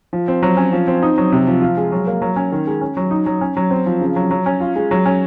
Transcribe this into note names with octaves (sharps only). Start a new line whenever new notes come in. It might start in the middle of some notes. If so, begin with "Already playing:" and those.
F3
C4
F#3
C#4
F3
C4
D#4
F#3
C3
F3
F4
G#3
F#3
A#3
F#3
C#4
D#3
G#3
C#4
F#3
D#4
F#3
C#4
F#3
C4
F3
C#3
F#3
F#3
C#4
F4
G#3
F#3
C#4